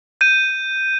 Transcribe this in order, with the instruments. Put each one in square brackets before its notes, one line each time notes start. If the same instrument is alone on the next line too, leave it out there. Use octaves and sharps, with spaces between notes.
[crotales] G6 D#7